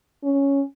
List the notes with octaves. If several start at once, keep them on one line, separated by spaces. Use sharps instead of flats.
C#4